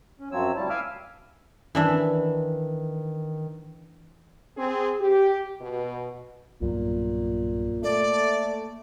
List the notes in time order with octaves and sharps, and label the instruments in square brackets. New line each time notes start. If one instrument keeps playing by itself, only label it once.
[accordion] C#4
F#2 F3 F#3 C4 C#5 E6
D2 G3 E4 A5
F5 G#5 B5 D6 E6 F6
[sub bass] D#3 [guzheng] E3 D4 E5
[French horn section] C4 G#4
G4
B2
[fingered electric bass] B1 G2 F#3 [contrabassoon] A#2
[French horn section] A3 [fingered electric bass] A#3 [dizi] D5